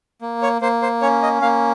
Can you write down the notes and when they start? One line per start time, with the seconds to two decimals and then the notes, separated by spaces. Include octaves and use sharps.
0.22 A#3
0.42 C#5
0.62 A#3 C5
0.82 C5
1.02 C#4 C#5
1.23 D#5
1.41 A#3 F5